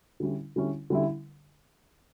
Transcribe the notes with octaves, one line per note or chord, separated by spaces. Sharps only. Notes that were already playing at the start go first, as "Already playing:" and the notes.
D3 G3 C#4 E4
D3 G3 C#4 E4
D3 G3 C#4 E4